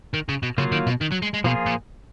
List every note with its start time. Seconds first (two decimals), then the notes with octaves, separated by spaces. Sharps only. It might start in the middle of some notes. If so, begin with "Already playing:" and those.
0.14 D#3
0.29 C#3
0.43 B2
0.58 C#3 F#3 A#3 F4
0.72 D#3
0.87 B2
1.01 D#3
1.12 F#3
1.22 G#3
1.34 G#3
1.44 B2 F3 A#3 F4 G#4
1.66 A#2